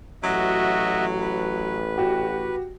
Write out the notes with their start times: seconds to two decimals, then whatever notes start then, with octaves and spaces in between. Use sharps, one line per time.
0.23 A1 F#3 F#4 D#5 E5
1.21 B4
1.98 F#4 G4